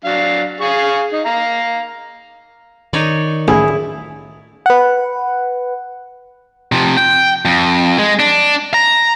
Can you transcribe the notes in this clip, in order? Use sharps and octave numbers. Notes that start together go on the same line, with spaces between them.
F#3 D4 F5
G#4 F5 C#6
D#4
F5 A#5
D#3 D#4 C#5 D5
A1 E4 G#4
B4 F#5
C3 F3
G5
F2
G#3
D4
A#5